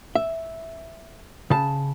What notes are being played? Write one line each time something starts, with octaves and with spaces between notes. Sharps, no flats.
E5
C#3 A5